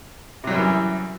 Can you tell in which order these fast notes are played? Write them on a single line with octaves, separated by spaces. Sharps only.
C3 F#3 G3 F#2 E3